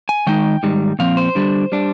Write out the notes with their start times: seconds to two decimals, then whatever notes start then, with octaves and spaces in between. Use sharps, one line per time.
0.09 G#5
0.27 D#3 G#3 D#4 G5
0.63 G#2 D#3 G3
0.99 A#2 F3 C4 F5
1.17 C5
1.35 D3 G3 D4
1.72 G3 D4